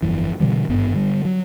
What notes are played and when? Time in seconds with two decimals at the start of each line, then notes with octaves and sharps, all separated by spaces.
0.03 G1 C2 F2 E3
0.40 B2 D3 E3 G3
0.69 G#1 G2 B3
0.94 D3 G3
1.25 F#3